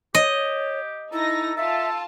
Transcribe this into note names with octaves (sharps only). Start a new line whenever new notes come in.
G4 C#5 D#5
D#4 E4 A4 A#6
F4 A4 E5 A5